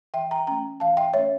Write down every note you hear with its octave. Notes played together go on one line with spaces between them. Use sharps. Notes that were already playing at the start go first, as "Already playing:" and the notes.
E3 E5 G5
G5 A#5
A3 C#4 G5 A#5
E3 F5 A5
E5 G5
A3 C#4 C#5 E5